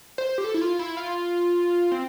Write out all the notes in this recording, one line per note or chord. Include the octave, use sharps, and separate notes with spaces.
C5
G4
A4
E4
F4
E4
F4
C4